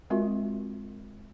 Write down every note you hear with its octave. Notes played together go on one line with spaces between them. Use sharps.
G#3 C4 F4 F#4 A#4 E5